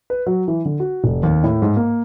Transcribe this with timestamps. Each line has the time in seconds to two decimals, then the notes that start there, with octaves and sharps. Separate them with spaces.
0.10 B4
0.27 F#3
0.48 E3
0.65 D3
0.80 F#4
1.04 F1
1.23 D#2
1.44 A2
1.62 G#2
1.77 A#3